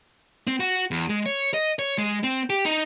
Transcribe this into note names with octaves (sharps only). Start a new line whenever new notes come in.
C4
F#4
E2
G#3
C#5
D#5
C#5
G#3
C4
G4
D#4